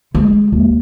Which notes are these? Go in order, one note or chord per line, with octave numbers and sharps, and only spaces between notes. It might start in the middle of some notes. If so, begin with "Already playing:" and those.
G#3
D#2